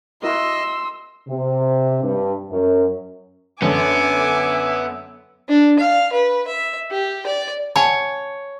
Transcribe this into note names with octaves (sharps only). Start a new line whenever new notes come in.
E4 F#4 A#4 D#5 C6 E6
C3
G2
F#2
F#2 D3 A3 B3 E5 G#5 D6
D4
F5
B4
E5
G4
D5
C#5 F#5 G#5 A5